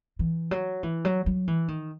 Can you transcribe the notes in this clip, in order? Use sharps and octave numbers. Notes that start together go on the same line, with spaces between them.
E3
F#3
E3
F#3
F#3
E3
D#3